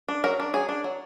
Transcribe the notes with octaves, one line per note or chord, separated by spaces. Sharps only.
D4
F#3 A#4
D4
F#3 G#4
D4
F#3